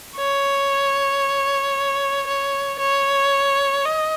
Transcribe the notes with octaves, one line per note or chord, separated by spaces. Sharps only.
C#5
C#5
C#5
D#5